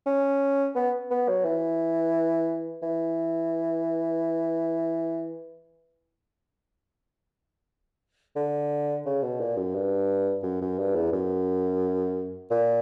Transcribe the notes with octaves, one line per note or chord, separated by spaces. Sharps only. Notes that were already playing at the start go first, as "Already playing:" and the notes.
C#4
B3
B3
F#3
E3
E3
D3
C#3
B2
A#2
F#2
G2
F#2
F#2
G2
E2
F#2
A#2